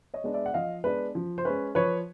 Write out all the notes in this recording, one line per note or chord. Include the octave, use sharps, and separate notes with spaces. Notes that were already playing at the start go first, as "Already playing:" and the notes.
C#5 D#5
G#3 B3 D4
D5 E5
F#5
F3 D#5 F5
G#3 B3 D4 B4
F3
C5
G#3 C#4 B4
F3 B4 C#5